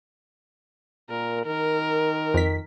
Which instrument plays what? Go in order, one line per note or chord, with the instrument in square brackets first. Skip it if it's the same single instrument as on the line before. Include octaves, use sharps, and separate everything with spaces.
[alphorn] A#2 [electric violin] A#4
[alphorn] D#3 [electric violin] A#4
[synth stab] F2 B6